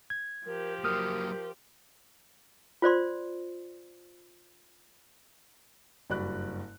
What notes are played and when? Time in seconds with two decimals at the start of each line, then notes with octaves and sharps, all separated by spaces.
0.10 G#6
0.46 F3 G4 A#4
0.84 F#3 A#3 A#4 D#6 F6
2.82 F4 C5 D5 C6
6.10 F#1 G2 F#4 D5 B5 F#6